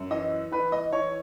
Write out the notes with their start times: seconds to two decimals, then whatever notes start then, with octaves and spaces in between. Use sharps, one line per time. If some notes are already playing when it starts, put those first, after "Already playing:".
Already playing: F#2
0.10 E3 D#5
0.51 E3 B4
0.72 D#5
0.92 E3 C#5